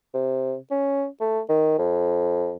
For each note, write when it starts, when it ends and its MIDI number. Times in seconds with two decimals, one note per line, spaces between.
0.14 0.56 48
0.71 1.06 61
1.21 1.41 57
1.49 1.74 51
1.78 2.57 41